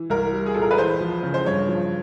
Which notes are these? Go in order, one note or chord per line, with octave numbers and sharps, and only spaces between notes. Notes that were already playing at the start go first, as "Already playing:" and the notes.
Already playing: E3
C2 A#4
G3
G#4
A#2 A4
A#4
B4
E2 C5
F3
C#3
C5
G2 C#5
F3